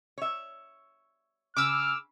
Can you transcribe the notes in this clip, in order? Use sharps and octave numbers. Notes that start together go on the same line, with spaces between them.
C#5 E5
C#3 D6 E6 F6